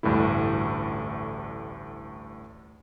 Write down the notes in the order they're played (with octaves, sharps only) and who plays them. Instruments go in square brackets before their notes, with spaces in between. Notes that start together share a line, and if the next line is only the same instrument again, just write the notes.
[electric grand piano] A1 D2 G2 G3 A3 E4